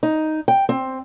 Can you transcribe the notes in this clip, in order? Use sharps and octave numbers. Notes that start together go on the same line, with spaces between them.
D#4
G5
C4